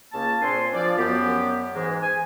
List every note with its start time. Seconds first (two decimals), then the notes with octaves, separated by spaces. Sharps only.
0.13 C#2 C#3 A#3 A5
0.41 A#2 C4 D4 G#5 C6
0.73 F3 D5
0.98 F#2 B3 G4
1.74 G#2 E3 G#3
2.02 G#5